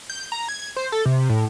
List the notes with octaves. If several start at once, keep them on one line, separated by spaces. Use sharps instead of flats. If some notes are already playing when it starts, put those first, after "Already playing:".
G6
A#5
G#6
C5
A4
C3
A2